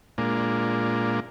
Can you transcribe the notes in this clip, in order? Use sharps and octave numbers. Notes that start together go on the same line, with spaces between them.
A#2 G#3 A#3 D4 F4